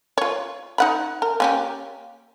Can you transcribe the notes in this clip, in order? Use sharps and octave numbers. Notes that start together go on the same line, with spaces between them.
F4 C#5
D#4 F#5 B5
A#4
A#3 C#4 G4